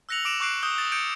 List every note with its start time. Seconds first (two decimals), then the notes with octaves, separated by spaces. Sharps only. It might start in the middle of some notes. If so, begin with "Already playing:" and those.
0.09 E6 F#6 A#6 C#7 F7 F#7
0.25 D6 D7 E7
0.40 C#6 D6 F#6 C7 D7
0.62 D#6 G6 G7
0.78 A6
0.92 D#6 G6 C#7 D7